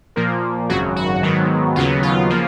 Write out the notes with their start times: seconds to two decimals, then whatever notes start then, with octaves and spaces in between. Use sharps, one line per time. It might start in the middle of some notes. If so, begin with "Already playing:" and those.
0.16 A#2 F3 A#3 A#4
0.69 G#1 F#2 C#3 F#3 F#4
0.96 F#4
1.23 G#2 D#3 F#3 B3
1.76 D#2 C#3 F#3 B3 F4
2.03 F4
2.30 C#3 F3 A#3